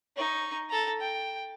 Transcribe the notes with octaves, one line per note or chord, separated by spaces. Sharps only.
D#4 C#6
A4 A#5
G5